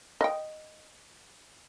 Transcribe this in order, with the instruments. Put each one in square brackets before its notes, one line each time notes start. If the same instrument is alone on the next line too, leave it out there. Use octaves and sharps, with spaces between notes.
[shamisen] D#5 G5